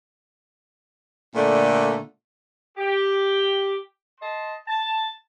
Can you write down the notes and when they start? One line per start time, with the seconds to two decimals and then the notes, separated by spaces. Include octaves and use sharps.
1.35 A#2 D3 A3
2.77 G4
4.21 D#5 A5 C6
4.68 A5